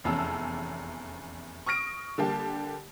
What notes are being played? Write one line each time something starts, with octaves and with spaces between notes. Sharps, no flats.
F1 E2 C#4 A5 E6
C#6 D#6 F6 A#6 D7
D3 G3 A#3 G4 A5